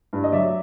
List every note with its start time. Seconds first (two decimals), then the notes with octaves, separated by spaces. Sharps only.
0.13 G2
0.24 D#5
0.32 F#3 D5 E5